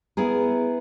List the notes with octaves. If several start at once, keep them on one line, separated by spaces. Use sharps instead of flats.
B3 E4 G#4 A#4